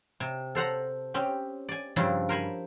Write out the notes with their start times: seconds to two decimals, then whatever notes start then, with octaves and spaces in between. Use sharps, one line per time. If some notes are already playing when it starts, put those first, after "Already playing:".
0.20 C3
0.55 A4 C5 F#5 A#5
1.14 C4 C#4 G4
1.69 D5 G#5
1.96 G2 C#3 F3 C4 D4 E4
2.29 A#4 C5 G#5 B5